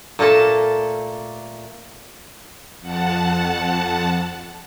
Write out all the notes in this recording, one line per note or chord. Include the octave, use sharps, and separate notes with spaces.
A#2 A3 A#3 A4 A5
F2 F#5 A5